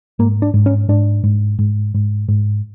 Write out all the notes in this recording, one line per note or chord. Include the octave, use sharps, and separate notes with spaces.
G#2 A#3
D4
G#2
C#4
G#2 D4
G#2
G#2
G#2
G#2